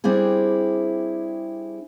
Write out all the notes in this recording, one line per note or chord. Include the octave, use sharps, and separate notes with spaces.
G3 C4 D4 E4 G#4